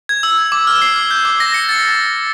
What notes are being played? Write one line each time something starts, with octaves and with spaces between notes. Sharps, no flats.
G#6
E6
G#6
D6
F6
C7
D6
G6
D6
A#6
C#7
A6